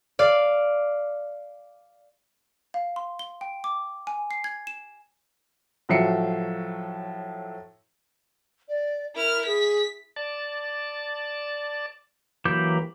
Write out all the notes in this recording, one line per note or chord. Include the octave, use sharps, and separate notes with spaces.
D5 F5
F5
C6
G7
G5
D6
G#5
C7
G#6
E7
A2 F3 F#3 E5 C7 C#7
D5
E4 A#4 F6
G#4 B6
D5 A5
E3 F#3 A#3 G4 D6 G6